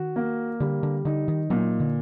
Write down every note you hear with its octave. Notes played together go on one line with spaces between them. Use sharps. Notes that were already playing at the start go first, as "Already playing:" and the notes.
Already playing: D#3 F#4
A#3
D3 G3
D3
D3 D#4
D#3
A#2 F#3
D3